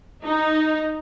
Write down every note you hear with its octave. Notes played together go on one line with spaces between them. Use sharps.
D#4